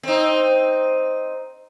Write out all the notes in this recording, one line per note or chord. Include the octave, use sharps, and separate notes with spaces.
C4 D#4